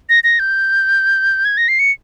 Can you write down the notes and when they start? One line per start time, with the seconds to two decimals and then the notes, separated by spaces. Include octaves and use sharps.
0.09 A#6
0.24 A#6
0.39 G6
1.45 G#6
1.58 A#6
1.68 C7
1.79 C#7